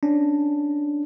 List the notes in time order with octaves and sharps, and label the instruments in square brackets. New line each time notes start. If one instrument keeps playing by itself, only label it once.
[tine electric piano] C#4 D4